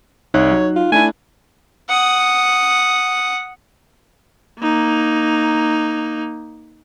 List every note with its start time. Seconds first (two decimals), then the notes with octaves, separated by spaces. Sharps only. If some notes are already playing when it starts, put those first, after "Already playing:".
0.34 C2 D#4 C#5 F#6
0.51 F#3
0.76 F4
0.92 A3 D4 E4 G#5
1.90 F#5 D#6
4.60 A#3 D#4